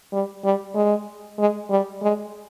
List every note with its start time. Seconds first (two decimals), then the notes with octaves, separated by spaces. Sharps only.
0.13 G3
0.44 G3
0.75 G#3
1.39 G#3
1.70 G3
2.02 G#3